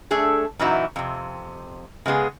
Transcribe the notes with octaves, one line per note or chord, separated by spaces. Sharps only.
A3 D4 G#4 A4
F#2 A#2 E3 D#4 E4 F#4
F2 C3
C#3 G#3 B3 G#4